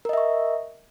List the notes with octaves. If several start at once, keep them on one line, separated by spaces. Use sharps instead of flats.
A#4 D#5 E5 C#6